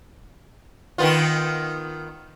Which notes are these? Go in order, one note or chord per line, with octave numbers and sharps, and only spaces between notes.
D#3 B3 F4